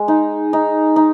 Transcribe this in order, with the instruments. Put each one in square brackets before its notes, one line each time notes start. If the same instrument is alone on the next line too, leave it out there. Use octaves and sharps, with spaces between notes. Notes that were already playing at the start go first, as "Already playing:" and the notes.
Already playing: [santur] G#3
D#4
D#4
D#4